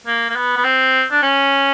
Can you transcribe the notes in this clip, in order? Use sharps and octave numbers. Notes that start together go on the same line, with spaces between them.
A#3
A#3
B3
B3
C4
D4
C#4